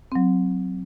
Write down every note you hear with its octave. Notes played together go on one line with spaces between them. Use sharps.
F#3 C4